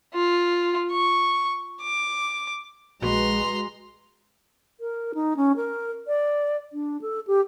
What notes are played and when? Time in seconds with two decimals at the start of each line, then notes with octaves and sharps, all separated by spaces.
0.14 F4
0.92 C#6
1.81 D6
3.02 A#1 G#3 F#4 B4 A#5 C6
4.80 A#4
5.14 D#4
5.37 C#4
5.56 A#4
6.07 D5
6.73 D4
7.02 A4
7.27 G4